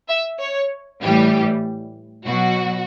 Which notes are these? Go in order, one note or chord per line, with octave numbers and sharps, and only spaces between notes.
E5
C#5
A2 E3 G3 G4
B2 F#3 F#4